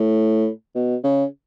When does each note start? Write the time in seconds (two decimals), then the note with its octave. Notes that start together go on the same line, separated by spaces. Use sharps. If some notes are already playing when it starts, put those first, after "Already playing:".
Already playing: A2
0.75 B2
1.04 C#3